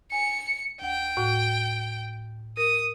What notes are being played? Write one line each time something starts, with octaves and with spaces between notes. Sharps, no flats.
G#5 C#7
D2 F#5 G5
A2 F#4 F#5
A#4 D#6